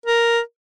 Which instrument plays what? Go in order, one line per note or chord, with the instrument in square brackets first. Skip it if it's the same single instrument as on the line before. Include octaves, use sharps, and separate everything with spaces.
[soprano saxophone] A#4